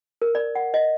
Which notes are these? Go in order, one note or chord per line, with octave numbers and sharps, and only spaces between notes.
A#4
D5
F#5
D#5